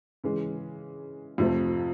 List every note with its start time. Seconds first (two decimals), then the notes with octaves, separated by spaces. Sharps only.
0.24 C#3 E3 G#3
1.38 F2 C3 F3 A3 C4